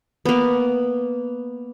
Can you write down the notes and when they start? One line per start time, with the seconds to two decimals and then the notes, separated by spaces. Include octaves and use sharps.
0.25 A#3 B3